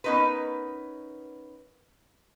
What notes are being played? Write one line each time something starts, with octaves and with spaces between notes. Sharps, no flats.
B3 C#4 D#4 A#4 B4